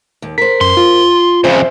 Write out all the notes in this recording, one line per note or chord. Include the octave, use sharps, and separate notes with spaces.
D#2
A#4 C5 B6
F#2 C6
F4
F2 C#3 C5 E5